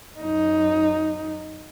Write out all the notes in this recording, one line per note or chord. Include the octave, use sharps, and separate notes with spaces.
F#2 D#4